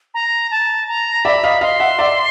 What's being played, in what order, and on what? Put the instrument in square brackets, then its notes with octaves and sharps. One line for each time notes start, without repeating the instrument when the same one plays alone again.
[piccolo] A#5
A5
A#5
[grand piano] D5 E5 [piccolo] B5
[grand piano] D#5 F5
[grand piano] D#5 F5 [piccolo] C6
[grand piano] E5 F#5
D5 E5